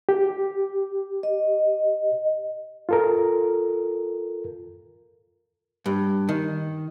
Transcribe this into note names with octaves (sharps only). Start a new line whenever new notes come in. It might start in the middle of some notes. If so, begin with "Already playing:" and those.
G4
D#5
F4 A4 A#4
G2
D#3